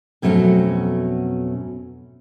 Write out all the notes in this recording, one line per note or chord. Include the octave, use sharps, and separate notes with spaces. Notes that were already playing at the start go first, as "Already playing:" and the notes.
F2 B2 F#3 A3 B3 C#4